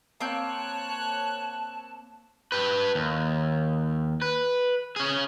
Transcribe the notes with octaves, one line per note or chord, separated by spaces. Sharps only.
A#3 C4 C#5 A5 F#6 G6
G4 B4
D#2
B4
C#4 G#4